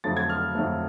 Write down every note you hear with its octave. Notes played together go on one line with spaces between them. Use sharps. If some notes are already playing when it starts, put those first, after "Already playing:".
F2 D3 F#3 A3 A6
G#6
F6
F2 D3 F#3 A3